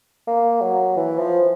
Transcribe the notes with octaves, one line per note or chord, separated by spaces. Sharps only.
A#3
F#3
E3
F3